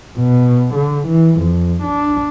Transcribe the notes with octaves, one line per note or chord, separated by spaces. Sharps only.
B2
D3
E3
F2
D4